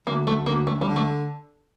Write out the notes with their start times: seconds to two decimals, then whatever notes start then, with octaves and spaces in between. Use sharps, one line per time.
0.07 D2 A#3
0.27 D2 A3
0.46 D2 A#3
0.66 D2 A3
0.81 G3
0.87 D3
0.96 A3